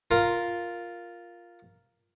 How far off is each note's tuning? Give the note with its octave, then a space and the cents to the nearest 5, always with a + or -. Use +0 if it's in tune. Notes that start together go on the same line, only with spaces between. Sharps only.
F4 +0 A#4 +0